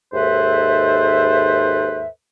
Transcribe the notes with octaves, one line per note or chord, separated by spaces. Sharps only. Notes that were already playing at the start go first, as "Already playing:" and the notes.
D#2 G#2 A4 B4 C5 E5